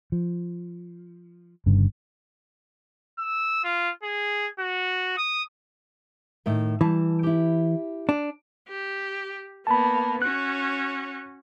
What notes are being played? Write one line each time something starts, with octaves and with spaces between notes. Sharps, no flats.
F3
G1 G2 C#3
E6
F4
G#4
F#4
D#6
A2 D#3 E5
E3 G3 A5
E4 G4
D4
G4
A#3 B3 A5 B5
C#4 F#4 F#6